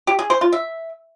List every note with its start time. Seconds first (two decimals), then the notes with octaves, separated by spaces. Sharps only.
0.07 G4
0.19 G#4
0.30 C5
0.41 F4
0.52 E5